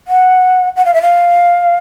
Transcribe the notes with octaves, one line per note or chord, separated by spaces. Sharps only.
F#5
F#5
F5
E5
F5